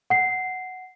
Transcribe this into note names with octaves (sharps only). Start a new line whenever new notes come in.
F#5 C7